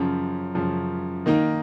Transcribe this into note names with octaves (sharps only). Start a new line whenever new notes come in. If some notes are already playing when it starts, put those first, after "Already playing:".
Already playing: F#2 C#3 F3
F#2 C#3 F3
D#3 A#3 D#4